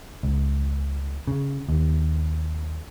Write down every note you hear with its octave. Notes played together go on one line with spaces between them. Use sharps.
C#2
C#3
D#2